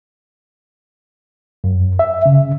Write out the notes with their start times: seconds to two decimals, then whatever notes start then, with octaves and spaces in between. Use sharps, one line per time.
1.64 F#2
1.99 E5
2.26 C#3